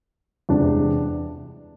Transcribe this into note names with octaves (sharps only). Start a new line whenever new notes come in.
E2 C3 G#3 D4